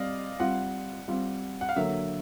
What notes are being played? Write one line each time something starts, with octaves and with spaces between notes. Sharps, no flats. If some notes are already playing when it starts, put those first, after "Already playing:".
Already playing: G3 C4 D5 D#5 F5
G3 C4 F4 F#5
G3 C4 F4
F#5
F5
D3 F#3 A#3 E5